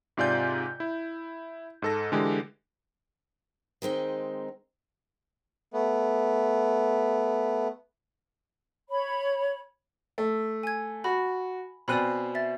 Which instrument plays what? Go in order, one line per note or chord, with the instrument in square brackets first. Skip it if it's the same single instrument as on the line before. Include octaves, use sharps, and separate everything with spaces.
[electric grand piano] G#2 C3 F4 D5 G#5 G6
E4
G#2 A4 A#6
D3 E3 G#3 G4
[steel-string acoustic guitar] D#3 G#3 C4 D#4
[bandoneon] A3 B3
[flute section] C#5 B5
[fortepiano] A3
[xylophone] G#5 G#6
[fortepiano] F#4 [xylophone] B5
[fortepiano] B2 C4 F#6 [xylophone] D5 G#5 B5
[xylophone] E5 A6